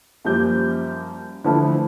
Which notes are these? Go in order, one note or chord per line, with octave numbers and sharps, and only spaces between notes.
F#2 F3 G3 A#3 G6
D3 E3 F3 A3 E4